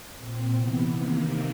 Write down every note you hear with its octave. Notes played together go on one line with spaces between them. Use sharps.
A#2 C4
C3 E3 B3
C3 D#3 A#3